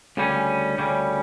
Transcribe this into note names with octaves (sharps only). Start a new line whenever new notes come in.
D2 C#3 G3 C#4
D2 C#3 G3 C#4